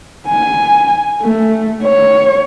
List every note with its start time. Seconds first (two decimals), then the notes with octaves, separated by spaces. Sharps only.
0.28 G#5
1.22 A3
1.83 C#5